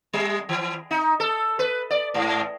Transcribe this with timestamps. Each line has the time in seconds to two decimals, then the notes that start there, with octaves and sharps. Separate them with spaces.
0.13 G3
0.49 E3
0.91 D#4
1.20 A4
1.59 B4
1.90 D5
2.14 G#2